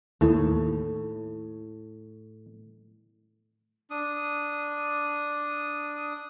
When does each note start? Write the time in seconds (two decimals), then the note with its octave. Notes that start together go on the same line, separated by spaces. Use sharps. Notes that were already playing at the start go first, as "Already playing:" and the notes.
0.21 D#2 A2
3.90 D4 D#6